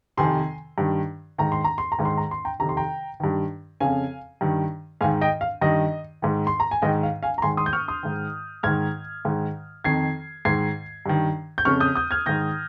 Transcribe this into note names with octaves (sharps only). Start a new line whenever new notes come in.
F2 C3 D#3 G#5 C6
G2 D#3
G#2 D#3 A#5
C6
A#5
C6
A#5
G#2 D#3
C6
A#5
C6
G5 A#5
F2 C3 D#3 A#5
C6
G5 A#5
G2 D#3
F2 C#3 F5 G#5
G2 D#3
G#2 D#3 F5 G#5
D#5 G5
F5
G2 D#3 D#5
G#2 D#3
C6
A#5
G#5
G#2 D#3 D#5 G5
F5
F5 G#5
A#5
G#2 D#3 G#5 C6
C6 D#6
G6
C#6 F6
C6 D#6
G#2 D#3
G#2 D#3 F6 G#6
G#2 D#3
F2 D#3 G#6 C7
G#2 D#3 G#6 C7
G2 D#3
G6
F2 C#3 C#6 F6
D#6 G6
D#6 G6
F6 G#6
G#2 D#3 G6 A#6